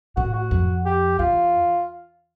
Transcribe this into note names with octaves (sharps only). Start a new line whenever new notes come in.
A2 F#4
F#4
F2
G4
E2 F4